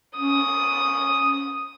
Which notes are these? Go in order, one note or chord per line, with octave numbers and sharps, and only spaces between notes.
C#4 D#6